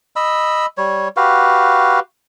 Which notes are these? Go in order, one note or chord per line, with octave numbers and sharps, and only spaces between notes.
D#5 B5 E6
G3 C#5
F#4 G4 B4 F5